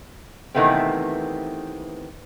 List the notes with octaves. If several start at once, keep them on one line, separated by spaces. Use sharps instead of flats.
C3 D#3 E3 A3 B3 C4